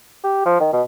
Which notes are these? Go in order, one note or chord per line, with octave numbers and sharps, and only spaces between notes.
G4
F3
D#3
B2